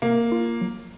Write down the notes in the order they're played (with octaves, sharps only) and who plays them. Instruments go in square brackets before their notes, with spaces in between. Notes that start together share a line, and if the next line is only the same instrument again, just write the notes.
[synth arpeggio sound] C3 [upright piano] A#3
[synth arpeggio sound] F4
F#3